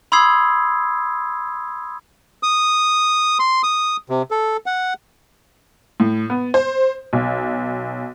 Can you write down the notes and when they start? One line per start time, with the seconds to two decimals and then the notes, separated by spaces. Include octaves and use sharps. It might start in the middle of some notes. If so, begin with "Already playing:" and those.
0.12 B5 C6 D#6 E6 G#6 C7
2.43 D#6
3.39 C6
3.63 D#6
4.09 C3
4.31 A4
4.66 F#5
6.00 A2
6.30 B3
6.54 C5
7.13 B1